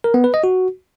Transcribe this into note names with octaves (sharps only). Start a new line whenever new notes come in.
A#4
B3
B4
D#5
F#4